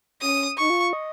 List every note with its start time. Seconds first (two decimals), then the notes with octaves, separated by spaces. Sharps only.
0.21 C#4 D#6
0.58 D#4 C#6
0.70 F4
0.93 D#5